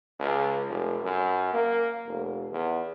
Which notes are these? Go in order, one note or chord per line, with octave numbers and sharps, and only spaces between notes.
C#2
F1
F#2
A#3
F1
E2